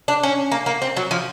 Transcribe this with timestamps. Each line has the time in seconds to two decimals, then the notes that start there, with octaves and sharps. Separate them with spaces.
0.08 D4
0.23 C#4
0.52 A#3
0.66 A#3
0.82 C4
0.97 F#3
1.11 F3